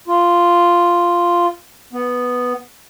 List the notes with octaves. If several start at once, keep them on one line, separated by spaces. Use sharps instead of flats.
F4
B3